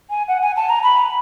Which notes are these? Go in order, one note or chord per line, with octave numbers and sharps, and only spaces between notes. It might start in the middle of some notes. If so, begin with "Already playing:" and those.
G#5
F#5
G#5
A5
A#5
B5